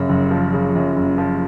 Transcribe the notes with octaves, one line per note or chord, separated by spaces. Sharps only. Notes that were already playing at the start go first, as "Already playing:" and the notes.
Already playing: F#2 C#3
F#1
F3
C#3
F#2
F#1
F3